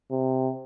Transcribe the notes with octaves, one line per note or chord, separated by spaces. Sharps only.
C3